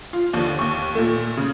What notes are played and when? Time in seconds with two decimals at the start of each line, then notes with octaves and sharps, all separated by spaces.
0.13 F4
0.33 D#2 D3 F3
0.59 D#2 C#6
0.95 A#2 A3
1.37 C#3